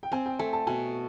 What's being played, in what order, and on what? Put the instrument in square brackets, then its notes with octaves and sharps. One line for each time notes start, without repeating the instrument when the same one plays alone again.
[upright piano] G5
[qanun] C4 [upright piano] G#5
[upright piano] G5
[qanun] A3 [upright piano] G#5
[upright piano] A5
[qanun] B2 [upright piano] G#5